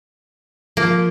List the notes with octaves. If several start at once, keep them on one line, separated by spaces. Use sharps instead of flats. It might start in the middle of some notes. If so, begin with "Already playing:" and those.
F3 A#3